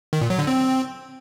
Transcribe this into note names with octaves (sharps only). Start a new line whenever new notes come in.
D#3
A#2
F#3
D3
C4